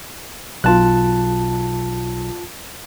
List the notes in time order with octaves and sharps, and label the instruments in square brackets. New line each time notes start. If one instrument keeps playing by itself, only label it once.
[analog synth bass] B1 [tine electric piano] F4 A5 F#6